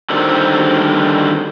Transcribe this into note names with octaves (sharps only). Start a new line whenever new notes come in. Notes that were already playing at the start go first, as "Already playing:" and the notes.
D3 D#3 G3 A#3 C4